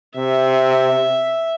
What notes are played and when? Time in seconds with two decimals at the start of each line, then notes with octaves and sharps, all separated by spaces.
0.17 C3 E5